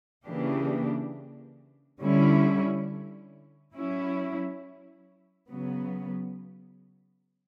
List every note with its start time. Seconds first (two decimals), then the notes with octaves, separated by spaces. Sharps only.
0.25 C#3 E3 A#3 D4 G4
1.99 D3 G3 C#4 E4
3.74 F#3 C#4 E4
5.49 C#3 F#3 B3